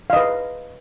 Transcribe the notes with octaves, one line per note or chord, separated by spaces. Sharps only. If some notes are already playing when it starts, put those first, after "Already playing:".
B4 D#5 F5